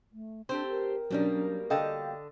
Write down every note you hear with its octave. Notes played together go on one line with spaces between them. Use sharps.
A3
A3 C4 D4 G4 C5
A#4
B2 F#3 G3 A#3 C#4 D4
D3 A4 D#5 F5 G5